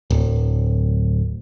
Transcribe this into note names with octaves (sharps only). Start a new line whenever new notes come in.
D1